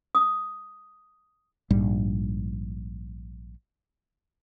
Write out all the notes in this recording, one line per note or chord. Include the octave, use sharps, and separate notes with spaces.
D#6
A#1 G#2 G3